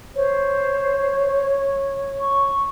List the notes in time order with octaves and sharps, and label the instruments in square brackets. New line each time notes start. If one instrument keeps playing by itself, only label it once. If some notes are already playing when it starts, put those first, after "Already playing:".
[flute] C5 [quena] C#5
[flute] C#6